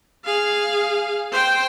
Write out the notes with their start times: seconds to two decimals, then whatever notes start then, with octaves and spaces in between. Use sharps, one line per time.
0.25 G#4 F5
1.32 C5 G5